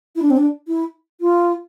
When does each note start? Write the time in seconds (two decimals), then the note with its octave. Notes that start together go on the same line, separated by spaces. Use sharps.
0.16 E4
0.22 D4
0.30 C4
0.37 D4
0.67 E4
1.21 F4